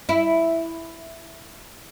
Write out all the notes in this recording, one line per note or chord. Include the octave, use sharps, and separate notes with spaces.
E4